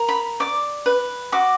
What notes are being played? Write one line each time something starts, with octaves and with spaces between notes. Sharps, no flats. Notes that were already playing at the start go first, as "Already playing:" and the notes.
Already playing: A#4
B5
D5 D6
B4
F#4 D6